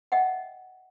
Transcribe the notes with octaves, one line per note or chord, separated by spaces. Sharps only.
D#5 E5 F#5 G5